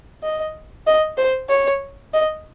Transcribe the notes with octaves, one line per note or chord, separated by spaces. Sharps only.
D#5
D#5
C5
C#5
D#5